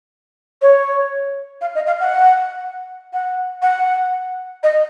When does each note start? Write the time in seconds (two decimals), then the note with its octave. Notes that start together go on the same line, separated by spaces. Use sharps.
0.61 C#5
1.61 F5
1.75 D#5
1.86 F5
2.00 F#5
3.13 F#5
3.62 F#5
4.63 D#5